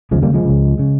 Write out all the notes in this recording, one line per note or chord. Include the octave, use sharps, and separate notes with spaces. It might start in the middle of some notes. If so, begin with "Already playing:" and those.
D#2 C#3 F3 G#3
G3 A#3
F3 G#3
C#2 C#3
C#3